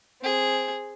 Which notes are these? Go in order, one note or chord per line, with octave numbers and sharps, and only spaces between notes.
C4 G#4